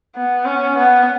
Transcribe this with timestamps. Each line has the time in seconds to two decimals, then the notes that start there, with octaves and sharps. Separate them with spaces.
0.16 B3
0.45 C#4
0.77 B3